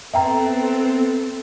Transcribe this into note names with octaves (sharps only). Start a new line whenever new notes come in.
B3 C4 A4 E5 G5 A#5